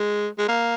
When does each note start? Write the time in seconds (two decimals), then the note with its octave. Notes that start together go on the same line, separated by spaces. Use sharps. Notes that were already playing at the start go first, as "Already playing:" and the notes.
Already playing: G#3
0.38 G#3
0.49 A#3